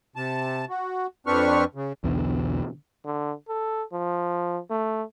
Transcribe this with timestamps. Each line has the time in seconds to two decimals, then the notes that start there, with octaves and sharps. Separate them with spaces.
0.16 C3 A5
0.70 F#4
1.27 F2 C4 D4 B4 C#6 F6
1.75 C#3
2.04 B1 E2 B2 D3
3.05 D3
3.48 A4
3.93 F3
4.70 A3